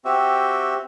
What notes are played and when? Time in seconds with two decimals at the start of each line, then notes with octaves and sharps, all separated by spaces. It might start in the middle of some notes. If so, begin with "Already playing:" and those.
0.05 C4 F#4 G4 E5